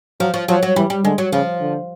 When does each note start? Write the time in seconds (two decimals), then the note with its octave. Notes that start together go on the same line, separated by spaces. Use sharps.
0.20 F3 F#3
0.34 F3
0.48 F3 F#3
0.63 F#3
0.76 E3 G3
0.90 G3
1.04 D3 G#3
1.18 F#3
1.32 C#3 F3
1.60 D3